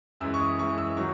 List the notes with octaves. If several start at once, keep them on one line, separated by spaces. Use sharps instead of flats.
F#2 E3 G#3 E6
C#6
D#6
F#2 E3 G#3 C#6
E6
D#3 F#3 C#6